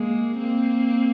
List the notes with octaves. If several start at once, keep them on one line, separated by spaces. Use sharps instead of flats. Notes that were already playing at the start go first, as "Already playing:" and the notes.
Already playing: G#3 A#3
A#3 C4